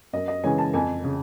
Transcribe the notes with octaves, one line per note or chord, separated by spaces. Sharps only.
F#2 D#5
D#5
C#3 E3 G#3 C#4 G#5
A5
F2 G#5
C#3